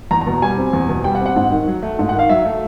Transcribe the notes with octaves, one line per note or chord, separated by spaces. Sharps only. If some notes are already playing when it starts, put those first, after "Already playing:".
E2 A#5
A#5
B2
G3 G#5
C4
E2
B2
G3 G5
F#5
C4
F#5
G#2
D#3
F#3
A3
G#2
F#5
D#3 F5
F#3 E5
A3